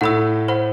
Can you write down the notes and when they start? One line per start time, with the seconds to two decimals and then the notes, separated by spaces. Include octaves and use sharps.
0.01 A2 A3 F#5 B5 E6
0.48 C5 F#5 B5